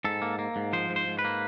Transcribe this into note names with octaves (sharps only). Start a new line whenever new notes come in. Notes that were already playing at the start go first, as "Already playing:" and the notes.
G#2 A4
A#3
A#3
G#2
F3 C5
G#2
C5
G#2
B4
A#3